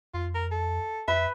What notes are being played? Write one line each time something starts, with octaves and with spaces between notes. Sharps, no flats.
F2 F4
A#4
A4
F2 B4 E5